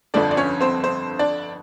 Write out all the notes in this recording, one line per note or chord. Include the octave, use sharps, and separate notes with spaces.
G1 F2 D3 F3 D4 D5
D5
C#4 C#5
C4 C5
C4 C5
D4 D5